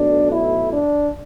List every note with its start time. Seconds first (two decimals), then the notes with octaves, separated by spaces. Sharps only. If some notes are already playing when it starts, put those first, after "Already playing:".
Already playing: B1 B2 A3 D4
0.32 E4
0.73 D4